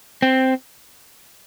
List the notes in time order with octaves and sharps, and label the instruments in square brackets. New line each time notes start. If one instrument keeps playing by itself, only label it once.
[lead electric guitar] C4